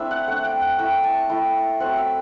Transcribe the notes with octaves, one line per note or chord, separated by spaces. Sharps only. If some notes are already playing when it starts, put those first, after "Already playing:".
Already playing: A3 C4 D4 E4 E5 B5
F#5
A3 D4 F#5
G5
F#5
A3 E4 G5
A5
A3 E4 G5
F#3 A3 C4 F#5
E5